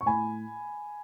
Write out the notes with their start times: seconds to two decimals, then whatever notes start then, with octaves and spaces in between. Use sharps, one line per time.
0.01 C#6
0.06 A2 G#5 B5